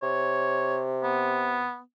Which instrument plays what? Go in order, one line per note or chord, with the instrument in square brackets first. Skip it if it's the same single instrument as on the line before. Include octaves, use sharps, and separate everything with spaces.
[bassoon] C3 [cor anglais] C#5
[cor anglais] B3